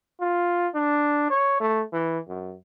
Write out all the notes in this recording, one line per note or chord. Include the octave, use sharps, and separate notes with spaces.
F4
D4
C#5
A3
E3
F#2